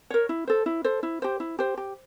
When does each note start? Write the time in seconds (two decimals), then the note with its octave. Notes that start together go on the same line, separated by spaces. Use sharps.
0.10 A#4 C#5
0.29 E4
0.47 A4 C5
0.66 E4
0.84 A4 C5
1.03 E4
1.22 G4 C5
1.40 E4
1.59 G4 C5
1.77 G4